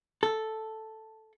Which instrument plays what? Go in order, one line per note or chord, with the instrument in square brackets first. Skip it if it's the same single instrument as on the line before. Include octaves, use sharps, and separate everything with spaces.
[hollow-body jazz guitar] A4